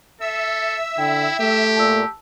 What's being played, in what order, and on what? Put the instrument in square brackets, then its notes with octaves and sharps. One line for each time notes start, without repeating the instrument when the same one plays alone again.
[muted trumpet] A4 [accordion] E5 E6
[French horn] D3 [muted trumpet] E4 [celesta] G5
[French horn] A3 [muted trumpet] G4
[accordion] A#2 [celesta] A5 E6